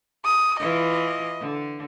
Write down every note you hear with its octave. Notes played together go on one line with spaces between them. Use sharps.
D#6
E3 E4 F4 D#5
D3